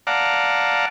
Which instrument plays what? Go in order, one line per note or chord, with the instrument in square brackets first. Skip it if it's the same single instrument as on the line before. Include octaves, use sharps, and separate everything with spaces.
[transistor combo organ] D5 F5 F#5 A5 A#5